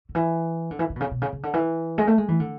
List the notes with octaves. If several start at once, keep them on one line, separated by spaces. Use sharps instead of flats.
D3
E3
D3
E3
D3
B2
C#3
B2
C#3
C#3
D3
E3
G#3
A3
G#3
E3
D3